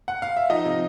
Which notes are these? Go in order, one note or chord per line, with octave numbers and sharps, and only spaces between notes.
F#5
F5
E5
F3 D#4 D#5
C3